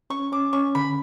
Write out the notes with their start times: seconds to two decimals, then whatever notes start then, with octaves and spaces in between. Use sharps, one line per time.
0.10 C#4 C#6
0.32 C#4 D6
0.53 C#4 C#6
0.75 D3 B5